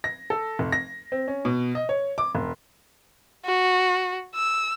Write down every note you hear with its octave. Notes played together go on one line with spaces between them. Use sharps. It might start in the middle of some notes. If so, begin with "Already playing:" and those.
A#6
A4
F1
A#6
C4
C#4
B2
D#5
C#5
D6
E1
F#4
E6